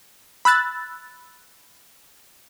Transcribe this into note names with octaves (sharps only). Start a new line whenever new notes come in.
B5 E6 F#6 A6